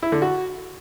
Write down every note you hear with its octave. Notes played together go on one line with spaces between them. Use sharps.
E4
D3
F#4